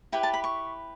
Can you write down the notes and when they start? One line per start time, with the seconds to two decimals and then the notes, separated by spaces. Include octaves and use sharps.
0.12 E4 G4 B4 G5
0.23 A5
0.34 B5
0.44 C#6